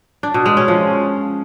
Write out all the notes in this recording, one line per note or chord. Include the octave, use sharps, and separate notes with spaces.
D4
B2
G#3
C#4
F3